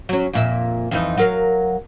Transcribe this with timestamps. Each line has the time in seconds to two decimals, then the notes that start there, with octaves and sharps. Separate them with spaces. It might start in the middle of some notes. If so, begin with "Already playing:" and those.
0.09 F#3 C#4
0.33 F2 A#2 E5
0.91 F2 E3 D#4
1.17 F#3 A#4 F5